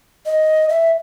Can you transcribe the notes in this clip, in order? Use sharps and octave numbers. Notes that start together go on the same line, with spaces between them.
D#5
E5